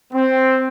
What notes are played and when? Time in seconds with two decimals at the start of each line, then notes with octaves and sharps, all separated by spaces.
0.13 C4